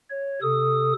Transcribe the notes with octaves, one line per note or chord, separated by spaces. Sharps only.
C#5
C3 A4 D#6